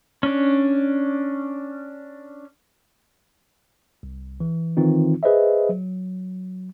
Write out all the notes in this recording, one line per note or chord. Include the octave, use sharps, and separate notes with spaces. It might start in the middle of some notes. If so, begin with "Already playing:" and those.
C#4 D4
C2
E3
D#3 E3 C4 D#4 F4
G#4 B4 C5 D#5 E5
F#3